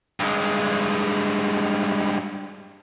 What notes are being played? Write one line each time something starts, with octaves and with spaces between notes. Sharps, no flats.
G2 G#3